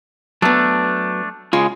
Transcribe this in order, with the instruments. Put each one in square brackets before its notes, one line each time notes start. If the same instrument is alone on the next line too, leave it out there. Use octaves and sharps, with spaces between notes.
[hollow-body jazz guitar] F#3 B3 [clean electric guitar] A3 D4
[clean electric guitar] C#3 G#3 [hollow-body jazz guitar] F4